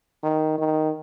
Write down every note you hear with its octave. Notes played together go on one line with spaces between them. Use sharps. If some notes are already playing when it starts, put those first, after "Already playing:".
D#3
D#3